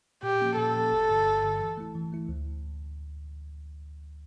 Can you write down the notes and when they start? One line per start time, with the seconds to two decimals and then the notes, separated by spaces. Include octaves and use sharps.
0.23 A#2 G4
0.41 F3 A#3 C#4
0.57 A#2 A4
0.75 F3 A#3 C#4
0.91 G1
1.09 G2 D3
1.27 G1
1.43 G2 D3
1.60 E3
1.78 A3 E4
1.95 E3
2.13 A3 E4
2.29 D2